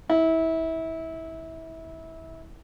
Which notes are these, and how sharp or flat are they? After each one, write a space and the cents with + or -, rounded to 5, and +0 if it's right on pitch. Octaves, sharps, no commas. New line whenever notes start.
E4 -25